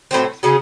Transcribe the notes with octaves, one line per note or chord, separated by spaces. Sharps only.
A2 F#3 C4
C#3 F#3 C#4 G#4